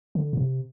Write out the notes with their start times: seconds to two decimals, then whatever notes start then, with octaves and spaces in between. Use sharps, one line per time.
0.15 D3
0.33 A2
0.37 C3